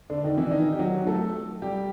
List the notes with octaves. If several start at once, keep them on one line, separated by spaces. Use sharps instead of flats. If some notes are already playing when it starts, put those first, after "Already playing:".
D3 D4
D#3 D#4
E3 E4
D4
D#3 D#4
G4
F#3 F#4
A3 A4
G3 G4